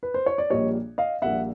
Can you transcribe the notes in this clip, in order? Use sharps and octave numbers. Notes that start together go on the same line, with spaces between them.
B4
C5
C#5
D5
A#1 A#2 G3 A#3 C#5 D#5
D#5 F5
A#1 A#2 G3 A#3 E5 F#5